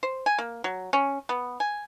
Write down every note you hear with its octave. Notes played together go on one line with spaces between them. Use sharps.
C5
G#5
A#3
F#3
C#4
B3
G#5